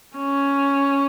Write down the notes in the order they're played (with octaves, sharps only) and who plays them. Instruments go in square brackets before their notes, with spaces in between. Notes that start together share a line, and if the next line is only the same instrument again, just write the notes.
[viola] C#4